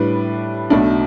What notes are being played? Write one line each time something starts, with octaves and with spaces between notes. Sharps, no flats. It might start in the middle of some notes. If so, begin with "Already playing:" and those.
Already playing: A2 G3 D4 B4
B1 B2 A3 D4